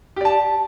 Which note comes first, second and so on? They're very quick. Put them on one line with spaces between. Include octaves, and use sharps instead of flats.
G4 D5 A5